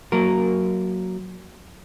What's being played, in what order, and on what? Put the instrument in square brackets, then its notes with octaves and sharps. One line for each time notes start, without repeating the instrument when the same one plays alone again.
[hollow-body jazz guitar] F#3 A#3 A#4